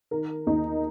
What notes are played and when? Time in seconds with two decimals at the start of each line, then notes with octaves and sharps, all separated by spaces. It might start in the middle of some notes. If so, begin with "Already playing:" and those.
0.11 D#3 A#4
0.46 D#2 D#4